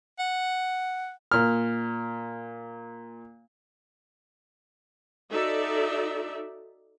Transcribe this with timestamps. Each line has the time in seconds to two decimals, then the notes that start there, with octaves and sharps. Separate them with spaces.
0.19 F#5
1.32 A#2 F6
5.31 D#4 F#4 A4 D5 E5